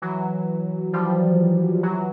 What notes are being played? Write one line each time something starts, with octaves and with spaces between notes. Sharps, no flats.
E3 F#3
F3 G3
E3 F#3